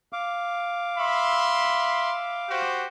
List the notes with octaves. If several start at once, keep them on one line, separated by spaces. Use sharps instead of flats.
F5 D6
E5 B5 C6
F#4 G4 C5